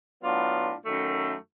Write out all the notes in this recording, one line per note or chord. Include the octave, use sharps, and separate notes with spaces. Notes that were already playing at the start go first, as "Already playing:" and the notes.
A2 F#3 B3 D4 F4
F#2 D#3 F#3 A3